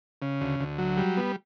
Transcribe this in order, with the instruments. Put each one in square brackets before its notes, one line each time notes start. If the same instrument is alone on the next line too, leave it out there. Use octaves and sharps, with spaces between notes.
[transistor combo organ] C#3
D2
D2
F#3
G3
B3